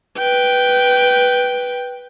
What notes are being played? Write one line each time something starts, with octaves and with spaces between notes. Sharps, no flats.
B4 G5